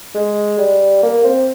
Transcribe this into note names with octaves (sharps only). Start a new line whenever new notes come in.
G#3
G3
A#3
C4